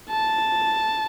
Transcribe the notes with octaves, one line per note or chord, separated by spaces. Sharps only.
A5